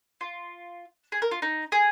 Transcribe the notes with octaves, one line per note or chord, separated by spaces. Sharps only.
F4
G#4
A#4
F4
D#4
G#4